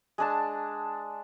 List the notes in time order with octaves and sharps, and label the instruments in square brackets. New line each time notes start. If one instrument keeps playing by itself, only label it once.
[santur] G#3 D4 A5